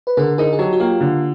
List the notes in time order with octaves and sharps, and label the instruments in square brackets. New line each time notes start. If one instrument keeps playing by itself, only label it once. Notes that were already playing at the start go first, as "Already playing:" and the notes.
[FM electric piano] B4
[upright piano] D3 [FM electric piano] G#4 A#4
[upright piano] D#4 [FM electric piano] G#4 A#4
[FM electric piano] G#4
[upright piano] F#3 [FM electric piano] G4 A4
[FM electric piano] F#4
[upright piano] A#3 [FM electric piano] F4 G4
[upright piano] D3